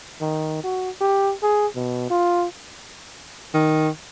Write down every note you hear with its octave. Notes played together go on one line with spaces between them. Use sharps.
D#3
F#4
G4
G#4
B2
F4
D#3